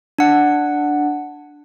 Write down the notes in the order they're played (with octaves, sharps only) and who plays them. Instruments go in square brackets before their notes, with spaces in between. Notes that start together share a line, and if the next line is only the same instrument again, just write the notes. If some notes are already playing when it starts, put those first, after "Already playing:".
[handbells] D4 F#5